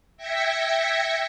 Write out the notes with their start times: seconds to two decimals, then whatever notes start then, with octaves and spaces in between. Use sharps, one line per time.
0.17 E5 G5 G#6 A#6 B6 C#7